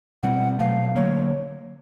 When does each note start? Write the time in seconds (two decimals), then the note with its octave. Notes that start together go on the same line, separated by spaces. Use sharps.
0.23 B2 G3 C4 F#5
0.59 B2 F#3 A3 F5
0.95 D3 F#3 A#3 C#5